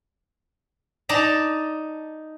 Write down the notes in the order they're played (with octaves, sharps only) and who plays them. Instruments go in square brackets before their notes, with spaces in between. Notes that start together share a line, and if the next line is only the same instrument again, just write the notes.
[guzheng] D#4 D5 A5 A#5